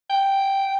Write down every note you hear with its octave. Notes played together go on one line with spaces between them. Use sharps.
G5